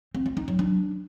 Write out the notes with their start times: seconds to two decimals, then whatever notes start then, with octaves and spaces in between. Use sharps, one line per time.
0.15 C4
0.26 F4
0.37 D#4
0.48 F#3
0.59 D4